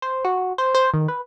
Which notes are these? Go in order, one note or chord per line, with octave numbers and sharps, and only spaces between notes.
C5
F#4
C5
C5
D#3
B4